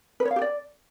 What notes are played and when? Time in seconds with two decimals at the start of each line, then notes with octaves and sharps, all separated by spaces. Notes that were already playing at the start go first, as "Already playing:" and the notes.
0.20 B4
0.25 C#5
0.31 F5
0.36 G4
0.42 D5